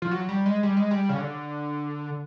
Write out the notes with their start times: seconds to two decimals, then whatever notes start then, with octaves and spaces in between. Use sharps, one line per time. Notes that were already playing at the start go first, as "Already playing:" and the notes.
0.02 F3
0.11 F#3
0.29 G3
0.46 G#3
0.63 G3
0.77 G#3
0.91 G3
1.09 C#3
1.16 D3